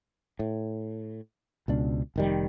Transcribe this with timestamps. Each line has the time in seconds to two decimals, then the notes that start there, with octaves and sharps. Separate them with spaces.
0.39 A2
1.68 C#2 B2 D4
2.16 F1 D#3 G3